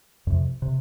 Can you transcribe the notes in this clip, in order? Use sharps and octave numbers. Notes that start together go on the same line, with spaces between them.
F2 C3
C3